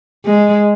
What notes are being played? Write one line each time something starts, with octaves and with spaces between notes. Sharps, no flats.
G#3